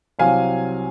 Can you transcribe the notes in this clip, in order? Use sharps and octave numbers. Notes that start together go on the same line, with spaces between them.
C2 C3 F#3 F5 G#5